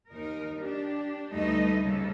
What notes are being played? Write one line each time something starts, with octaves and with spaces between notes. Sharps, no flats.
D#2 D#4 A#4
D4 G4
D2 G3 A3 D#4 B4 D#5
G2 C#3 A#3 A4